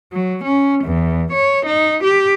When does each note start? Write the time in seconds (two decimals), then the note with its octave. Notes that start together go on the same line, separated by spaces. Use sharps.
0.13 F#3
0.44 C#4
0.84 E2
1.32 C#5
1.66 D#4
2.04 G4